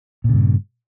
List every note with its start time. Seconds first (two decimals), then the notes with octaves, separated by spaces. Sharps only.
0.24 A#2
0.29 C#3
0.34 G2